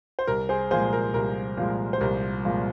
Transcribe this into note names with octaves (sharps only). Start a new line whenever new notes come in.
C5
C2 A#4
G#4 C5
A#2 F3 G#3 G#4 C5
A#4
C2 A#4
A#2 F3 G#3
C5
C2 A#4
A#2 F3 G#3